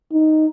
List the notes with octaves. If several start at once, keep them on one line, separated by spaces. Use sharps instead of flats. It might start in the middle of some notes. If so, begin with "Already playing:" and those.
D#4